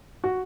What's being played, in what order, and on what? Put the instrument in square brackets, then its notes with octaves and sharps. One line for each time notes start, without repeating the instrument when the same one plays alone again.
[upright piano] F#4